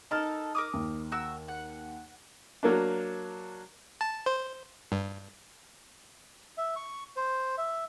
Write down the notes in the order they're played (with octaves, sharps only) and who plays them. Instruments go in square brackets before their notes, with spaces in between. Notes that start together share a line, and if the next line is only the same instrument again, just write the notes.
[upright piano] D#4 F6 [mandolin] A4 A#4 A5
[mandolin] A#4 D6 D#6
[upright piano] D#2
[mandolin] F#4 A#4 E6
F#5
[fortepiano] F#3 A#3 D4
[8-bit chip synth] A5
C5
G2
[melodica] E5
C#6
C5
E5